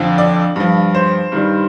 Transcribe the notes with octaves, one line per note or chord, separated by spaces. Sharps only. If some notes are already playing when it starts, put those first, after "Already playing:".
Already playing: F2 D3 F3
D5
G2 F3
C5
G2 D#3 G3